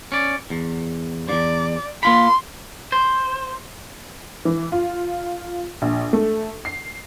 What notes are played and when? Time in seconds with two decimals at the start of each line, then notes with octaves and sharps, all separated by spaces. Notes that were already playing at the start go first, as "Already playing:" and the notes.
0.12 C#4 D5
0.50 E2
1.29 E2 G2 D5
2.03 A#3 F4 B5 C6
2.92 C5
4.45 E3
4.72 F4
5.82 A#1
6.13 A3
6.65 C7